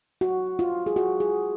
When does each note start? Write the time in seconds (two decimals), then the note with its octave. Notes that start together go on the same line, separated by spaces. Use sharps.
0.21 F#4
0.59 F4
0.86 G#4
0.96 F#4
1.20 G#4